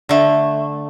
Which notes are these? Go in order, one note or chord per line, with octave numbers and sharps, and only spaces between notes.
D3 A3